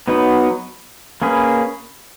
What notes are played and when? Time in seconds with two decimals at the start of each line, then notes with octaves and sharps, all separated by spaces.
0.08 F#3 B3 D#4 F#4 B4
1.22 A#3 C#4 G#4 B4